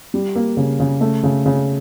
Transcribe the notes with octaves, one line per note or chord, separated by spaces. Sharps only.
G3
A#3
C#3
C#3
A3
C#3
C#3